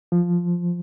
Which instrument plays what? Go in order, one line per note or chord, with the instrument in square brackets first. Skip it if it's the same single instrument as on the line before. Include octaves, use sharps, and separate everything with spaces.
[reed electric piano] F3